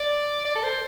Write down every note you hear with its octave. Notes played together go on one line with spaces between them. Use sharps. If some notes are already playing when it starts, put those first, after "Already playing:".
Already playing: D5
D5
A4
C5